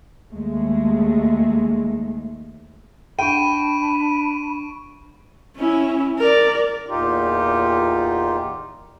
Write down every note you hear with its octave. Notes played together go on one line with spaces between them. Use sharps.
D#2 G#3 A3
D4 G5 B5 C#6 D7 D#7
C#4 E4
A#4 D5
E2 A#2 D#4 F4 G4